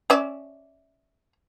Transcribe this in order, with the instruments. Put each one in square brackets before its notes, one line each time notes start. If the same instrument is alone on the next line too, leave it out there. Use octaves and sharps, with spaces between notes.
[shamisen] C#4 D5 E5